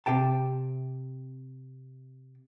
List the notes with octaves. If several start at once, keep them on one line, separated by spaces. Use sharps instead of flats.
C3 G4 G5 A5